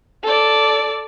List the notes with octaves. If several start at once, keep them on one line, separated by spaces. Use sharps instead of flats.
A4 D5